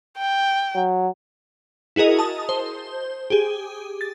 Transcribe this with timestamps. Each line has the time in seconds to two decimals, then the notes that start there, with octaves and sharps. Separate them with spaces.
0.18 G5
0.76 F#3
1.96 E4 F#4 G#4 A#4 D#5
2.19 A5 D#6
2.49 C5
3.30 G4 G#4
4.01 A6